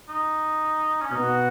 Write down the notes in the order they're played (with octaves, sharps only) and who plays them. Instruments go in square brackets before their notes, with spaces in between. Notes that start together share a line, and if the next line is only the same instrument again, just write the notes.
[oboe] D#4
C#4
[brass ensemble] B2 B3 F#4 [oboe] D#4